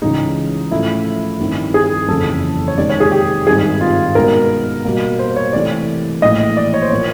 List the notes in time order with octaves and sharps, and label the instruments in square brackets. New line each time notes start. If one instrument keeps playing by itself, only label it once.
[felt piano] C#2 C#3 E3 G#3 [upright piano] D#4
[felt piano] A2 F3 A3 C#4 [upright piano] E4
[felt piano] G2 D#3 G3 C4 E4
[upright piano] G#4
[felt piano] F#1 F2 C#3 E3 [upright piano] A4
[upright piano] C#5
[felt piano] C3 D#3 G#3 [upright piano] D5
[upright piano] C#5
G#4
G4
[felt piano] G#1 G2 D#3 G3 C4 [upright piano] G#4
[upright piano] F4
[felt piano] B2 G#3 B3 D#4 [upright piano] A#4
[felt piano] B2 G3 A#3
[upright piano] C5
C#5
[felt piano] C3 E3 A3 [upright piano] D5
[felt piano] A#1 A2 E3 [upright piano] D#5
[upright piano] D5
C#5
C5
[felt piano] A#2 F3 A#3 [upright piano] C#5